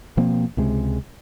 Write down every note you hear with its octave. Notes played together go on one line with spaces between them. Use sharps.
B2 F3 A#3 C4
C#2 C3 G#3